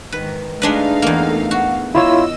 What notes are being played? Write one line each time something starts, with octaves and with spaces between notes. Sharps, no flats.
G#2 D#3 B4
G#3 A3 D4 D#4 B4 F5
E2 A#3
F#4
E4 F4 C#5 D#5 E6